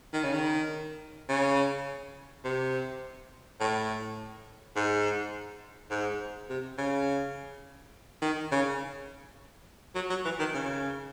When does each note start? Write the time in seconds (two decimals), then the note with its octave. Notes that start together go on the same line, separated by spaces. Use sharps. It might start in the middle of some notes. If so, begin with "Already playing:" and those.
0.13 D#3
0.23 C#3
0.34 D#3
1.29 C#3
2.45 C3
3.60 A2
4.76 G#2
5.91 G#2
6.50 C3
6.78 C#3
8.22 D#3
8.52 C#3
9.95 F#3
10.10 F#3
10.25 E3
10.39 D#3
10.54 C#3